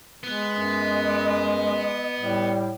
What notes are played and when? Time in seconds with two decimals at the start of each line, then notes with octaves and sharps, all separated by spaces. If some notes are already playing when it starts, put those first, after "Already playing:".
0.23 G#3 B3
0.56 F#2 D#5
2.19 A2 G3